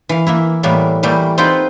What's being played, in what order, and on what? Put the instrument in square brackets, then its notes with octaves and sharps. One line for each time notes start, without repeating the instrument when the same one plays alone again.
[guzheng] E3 F5
E3 A#3 E4
A2 E3 G3 A#3 B3
E3 G3 A3 A#3
C4 D#4 F4 B4 F#5 G5